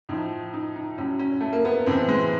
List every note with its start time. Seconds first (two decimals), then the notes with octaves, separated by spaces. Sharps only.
0.09 A2 F3 D#4
0.54 D#4
0.76 D#4
0.98 A2 F#3 C#4
1.19 C#4
1.41 A3
1.53 A#3
1.65 B3
1.86 A2 E3 C4
2.08 G#3